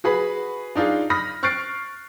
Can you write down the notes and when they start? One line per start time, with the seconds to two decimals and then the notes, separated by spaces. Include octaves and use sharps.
0.04 F#4 G#4 B4 B5
0.75 D4 D#4 F4 G#4
1.10 B5 D#6 F6 A#6
1.43 C#6 F6 F#6 A6 C7 D7